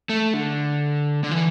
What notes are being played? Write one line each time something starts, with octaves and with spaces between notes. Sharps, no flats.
A3
D3
D3
E3